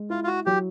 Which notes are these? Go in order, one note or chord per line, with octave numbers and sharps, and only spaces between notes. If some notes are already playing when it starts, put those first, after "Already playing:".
Already playing: G#3
E4 F4
F4
F#4
F#3 G4